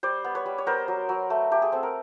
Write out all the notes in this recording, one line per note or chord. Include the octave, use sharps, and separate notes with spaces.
G3 C5 D5
B3
B4 C#5
G3
C#5
B3 A#4 C5
F#3
F#3
A3
A3 G4
G#4
C4 A4
A#4